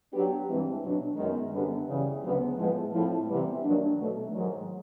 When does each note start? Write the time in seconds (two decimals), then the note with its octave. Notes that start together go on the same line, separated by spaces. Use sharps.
0.11 F#3 B3 D4 G4
0.46 G2 E3 G#3 C4
0.81 B2 F#3 B3 D4
1.16 F#2 D#3 G#3 B3
1.52 F#2 D3 G3 B3 D4
1.87 C#3 E3 G3
2.21 D2 C#3 F#3 B3
2.56 A2 F3 G#3 B3
2.91 A2 F3 A3 C4 E4
3.27 C3 E3 G3 B3
3.62 G2 D#3 F#3 A#3 D4
3.97 B2 F#3 A3
4.32 G#2 D#3 F#3